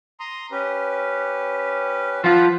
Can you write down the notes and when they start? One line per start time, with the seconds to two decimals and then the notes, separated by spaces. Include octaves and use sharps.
0.20 A#5 C6 D#6
0.52 C#4 G4 B4
2.24 F3 F4 F#5 B5